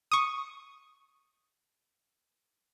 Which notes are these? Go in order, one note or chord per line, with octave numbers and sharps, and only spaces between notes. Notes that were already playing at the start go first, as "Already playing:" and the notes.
C#6 D#6